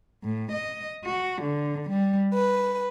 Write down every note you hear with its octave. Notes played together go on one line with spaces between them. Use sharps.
A2
D#5
F#4
D3
G3
B4